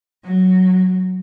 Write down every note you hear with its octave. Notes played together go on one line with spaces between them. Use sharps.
F#3